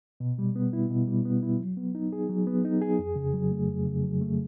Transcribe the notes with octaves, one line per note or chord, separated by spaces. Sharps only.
B2
G3
B3
E4
B2
G3
B3
E4
F#3
B3
D#4
G#4
F#3
B3
D#4
G#4
F2
C#3
F#3
A3
F2
C#3
F#3
A3